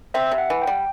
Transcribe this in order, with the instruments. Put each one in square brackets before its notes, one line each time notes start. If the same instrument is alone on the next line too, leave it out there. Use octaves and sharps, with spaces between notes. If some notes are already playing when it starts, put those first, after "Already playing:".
[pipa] C4 [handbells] E5
[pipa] C3
[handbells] F#5
[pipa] E3
[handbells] G5
[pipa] G3